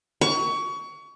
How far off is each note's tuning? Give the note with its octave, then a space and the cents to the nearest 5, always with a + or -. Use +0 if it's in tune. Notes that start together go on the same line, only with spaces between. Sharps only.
C#6 +25